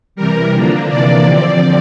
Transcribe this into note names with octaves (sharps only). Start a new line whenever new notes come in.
C3 E3 G3 A#4
D3 F3 A#3 D4
C3 E3 A#3 D4 D5
D3 F3 C4